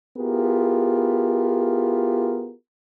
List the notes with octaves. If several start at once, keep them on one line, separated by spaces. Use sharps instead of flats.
B3 E4 F4 G4 G#4 A#4